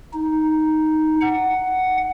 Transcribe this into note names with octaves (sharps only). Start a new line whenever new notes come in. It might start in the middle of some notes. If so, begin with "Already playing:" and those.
D#4
F#5